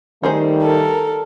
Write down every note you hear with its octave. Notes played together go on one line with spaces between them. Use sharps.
D#3 G3 A3 D#4 G#4 C5
A4 A#4